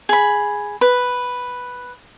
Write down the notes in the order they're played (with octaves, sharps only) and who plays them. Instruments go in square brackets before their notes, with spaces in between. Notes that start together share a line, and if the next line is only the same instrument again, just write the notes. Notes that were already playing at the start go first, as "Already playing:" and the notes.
[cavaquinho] G#4 B5
B4